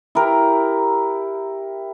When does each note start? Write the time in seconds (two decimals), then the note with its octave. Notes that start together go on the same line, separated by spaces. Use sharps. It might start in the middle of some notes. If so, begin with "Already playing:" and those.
0.15 E4 G4 A#4